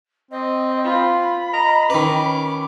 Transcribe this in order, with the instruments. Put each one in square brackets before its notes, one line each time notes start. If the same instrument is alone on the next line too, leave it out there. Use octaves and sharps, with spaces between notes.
[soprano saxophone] C4 [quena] D#5
[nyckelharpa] F4 [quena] B5
[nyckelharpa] D#5 [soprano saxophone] A#5
[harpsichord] D#3 B4 [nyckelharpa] C#4 [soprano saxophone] D6